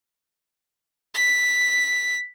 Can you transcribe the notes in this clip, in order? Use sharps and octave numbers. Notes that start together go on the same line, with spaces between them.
B6